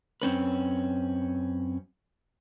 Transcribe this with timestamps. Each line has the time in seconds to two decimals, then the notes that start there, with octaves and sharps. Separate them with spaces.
0.22 F#2 C4 C#4 B4